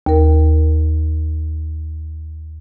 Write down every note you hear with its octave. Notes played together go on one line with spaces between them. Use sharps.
D#2 A#4